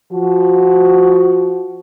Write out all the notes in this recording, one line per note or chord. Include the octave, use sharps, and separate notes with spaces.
F3 F#4